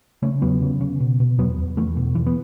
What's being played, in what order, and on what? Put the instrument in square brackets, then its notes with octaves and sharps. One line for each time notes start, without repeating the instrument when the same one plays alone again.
[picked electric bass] C#3 A3 C#4
E2 F#3 B3
C#3
C#3
B2
B2
E2 F#3 B3
E2
E2 E3 A3
B2
E2 E3
B3